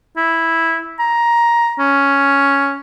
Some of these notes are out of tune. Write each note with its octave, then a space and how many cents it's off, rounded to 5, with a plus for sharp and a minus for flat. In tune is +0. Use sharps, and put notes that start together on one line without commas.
E4 -5
A#5 +10
C#4 +5